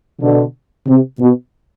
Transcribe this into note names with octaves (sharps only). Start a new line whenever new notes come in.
B2 D3
C3
B2